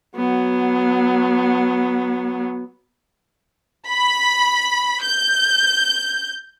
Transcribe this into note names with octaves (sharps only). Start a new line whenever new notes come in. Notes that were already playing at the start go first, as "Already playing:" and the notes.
F#3 B3
B5
G6